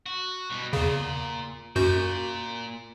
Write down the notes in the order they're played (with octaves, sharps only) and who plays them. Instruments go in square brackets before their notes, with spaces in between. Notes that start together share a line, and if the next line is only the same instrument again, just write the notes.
[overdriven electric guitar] F#4
B2 G3
[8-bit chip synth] E2 C#3 [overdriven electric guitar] A#2
[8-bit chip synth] F#2 F#4 G6 [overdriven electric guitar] A#2